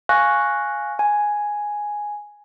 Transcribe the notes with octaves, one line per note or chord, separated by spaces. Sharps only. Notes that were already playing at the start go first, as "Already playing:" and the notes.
F5 G#5 C#6 F#6 A#6
G#5